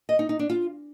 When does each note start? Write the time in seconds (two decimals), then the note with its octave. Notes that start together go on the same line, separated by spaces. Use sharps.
0.09 D#5
0.19 D#4
0.29 D#4
0.39 D4
0.50 F4